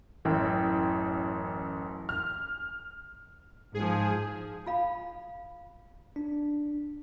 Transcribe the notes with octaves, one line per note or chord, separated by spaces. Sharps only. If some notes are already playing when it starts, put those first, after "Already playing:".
A1 F#2 E3 G5
F6
G#2 F3 G#4
F4 F5 B5
D4